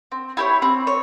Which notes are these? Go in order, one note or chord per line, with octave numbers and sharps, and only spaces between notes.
C4
E4 G4 C#5
C4
C#5